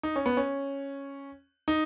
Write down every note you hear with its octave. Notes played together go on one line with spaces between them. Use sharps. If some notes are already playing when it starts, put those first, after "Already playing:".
D#4
C#4
B3
C#4
D#4